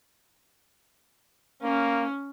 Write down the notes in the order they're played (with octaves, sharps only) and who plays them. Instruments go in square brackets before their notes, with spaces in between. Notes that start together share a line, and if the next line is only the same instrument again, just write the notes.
[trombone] A#3 [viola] C#4